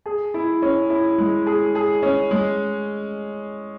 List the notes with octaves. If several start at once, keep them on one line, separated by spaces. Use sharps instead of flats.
G#4
E4
C#4
E4
G#3
G#4
G#4
C#4
G#3